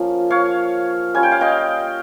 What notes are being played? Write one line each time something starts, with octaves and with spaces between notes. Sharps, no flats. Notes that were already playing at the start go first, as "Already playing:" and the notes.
Already playing: F3 A#3 C#4
C#5 F5
G3 C#4 F4 G#5
G5
F5
D#5 G5